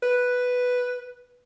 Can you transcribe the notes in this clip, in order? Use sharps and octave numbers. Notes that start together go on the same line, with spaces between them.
B4